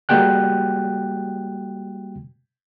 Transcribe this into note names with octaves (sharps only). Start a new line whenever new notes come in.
G3 G#3 A#3 F#4 G5 F#6